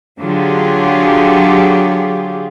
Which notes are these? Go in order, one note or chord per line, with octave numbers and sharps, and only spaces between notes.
D3 F#3 F4 G4 G#4